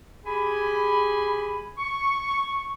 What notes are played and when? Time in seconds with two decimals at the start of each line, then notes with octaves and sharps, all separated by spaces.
0.24 G4 G#4 G#5 B5
1.77 C#6